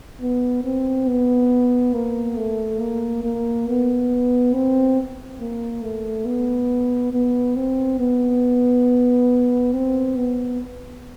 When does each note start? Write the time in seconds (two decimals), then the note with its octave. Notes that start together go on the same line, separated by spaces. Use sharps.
0.21 B3
0.64 C4
1.08 B3
1.93 A#3
2.37 A3
2.80 A#3
3.24 A#3
3.67 B3
4.53 C4
5.40 A#3
5.83 A3
6.26 B3
7.12 B3
7.55 C4
7.99 B3
9.72 C4
10.15 B3